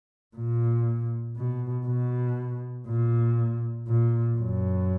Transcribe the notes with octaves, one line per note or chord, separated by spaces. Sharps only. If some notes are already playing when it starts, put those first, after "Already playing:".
A#2
B2
B2
A#2
A#2
F#2